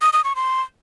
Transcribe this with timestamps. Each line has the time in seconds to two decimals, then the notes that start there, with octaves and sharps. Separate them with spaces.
0.02 D#6
0.13 D#6
0.24 C#6
0.36 C6